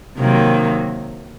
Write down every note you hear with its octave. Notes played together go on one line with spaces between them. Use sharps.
C3 D#3 F#3 A#3